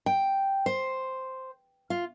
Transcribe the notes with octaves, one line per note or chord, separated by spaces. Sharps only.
G5
C5
F4